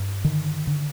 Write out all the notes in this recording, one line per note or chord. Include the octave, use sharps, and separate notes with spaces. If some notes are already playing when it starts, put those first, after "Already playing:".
Already playing: G2
D3 D#3
D3